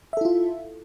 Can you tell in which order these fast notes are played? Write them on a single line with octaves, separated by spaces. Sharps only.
E5 A4 E4 F4